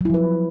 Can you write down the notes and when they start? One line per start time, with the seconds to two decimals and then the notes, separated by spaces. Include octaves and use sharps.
0.01 F#3
0.05 E4
0.10 F3
0.14 B4